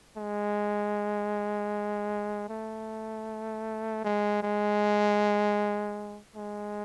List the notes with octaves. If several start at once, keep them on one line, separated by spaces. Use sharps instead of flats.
G#3
A3
G#3
G#3
G#3